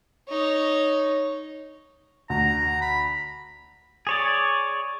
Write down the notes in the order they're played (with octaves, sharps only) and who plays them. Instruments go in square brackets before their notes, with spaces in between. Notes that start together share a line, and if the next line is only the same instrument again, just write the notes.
[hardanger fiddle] D#4 C#5
[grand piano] D2 [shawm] A#5
[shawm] B5
[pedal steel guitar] G#4 C#5 D5